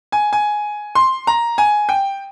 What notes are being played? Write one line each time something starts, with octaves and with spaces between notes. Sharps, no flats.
G#5
G#5
C6
A#5
G#5
G5